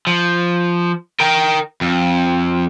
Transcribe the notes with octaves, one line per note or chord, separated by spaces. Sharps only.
F3
A#4 G5
F2